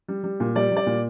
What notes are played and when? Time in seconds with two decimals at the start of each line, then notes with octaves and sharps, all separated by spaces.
0.08 G3
0.24 G3
0.40 A#2
0.55 G3 D5
0.71 G3
0.76 D5
0.86 A#2